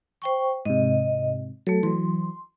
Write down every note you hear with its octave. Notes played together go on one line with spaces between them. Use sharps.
C5 G5 C#6
G#2 C3 D#5
F#3 A3 A4
E3 F#3 C6